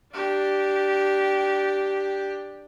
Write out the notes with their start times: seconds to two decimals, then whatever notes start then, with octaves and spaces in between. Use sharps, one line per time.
0.13 D4 G4